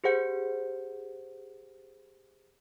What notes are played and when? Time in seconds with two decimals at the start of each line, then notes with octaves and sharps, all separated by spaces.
0.04 G4 G#4 C5 F#5 G6 C#7